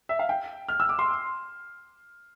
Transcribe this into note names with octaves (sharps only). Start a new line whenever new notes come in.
E5
F5
G5
F6
E6
D6
C6